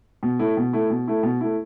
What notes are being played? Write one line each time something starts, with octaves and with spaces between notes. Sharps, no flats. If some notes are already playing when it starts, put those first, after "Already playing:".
B2
A3 E4
B2
A3 E4
B2
A3 E4
B2
A3 E4